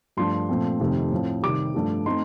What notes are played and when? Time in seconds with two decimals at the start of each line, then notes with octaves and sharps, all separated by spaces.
0.17 G2 F3 A3 D4 C6
0.49 A#2 F3 A3 C4
0.80 F2 C3 D#3 A3
1.11 A2 F3 C4
1.43 C3 D#3 G3 D6
1.74 G2 F3 A3 D4
2.06 A3 C4 D#4 C6